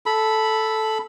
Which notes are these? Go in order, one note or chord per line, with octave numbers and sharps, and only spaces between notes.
A4 B5